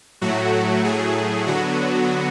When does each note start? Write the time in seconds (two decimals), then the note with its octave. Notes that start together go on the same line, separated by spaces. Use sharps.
0.21 A2 F#3 A3 F#4
0.84 A2 F#3 A3 G#4
1.47 D3 F#3 B3 F#4